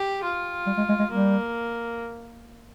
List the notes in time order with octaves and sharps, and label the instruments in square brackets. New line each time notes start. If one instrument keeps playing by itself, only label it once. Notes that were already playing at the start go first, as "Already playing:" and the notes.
Already playing: [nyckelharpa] G4
F4
[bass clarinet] G3
G#3
G#3
G#3
[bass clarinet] G3 [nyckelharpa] A#3